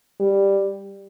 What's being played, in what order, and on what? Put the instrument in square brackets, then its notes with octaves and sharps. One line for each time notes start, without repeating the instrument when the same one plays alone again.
[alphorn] G3